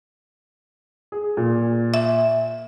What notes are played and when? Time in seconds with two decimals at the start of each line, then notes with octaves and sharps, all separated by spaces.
1.12 G#4
1.37 A#2
1.94 E5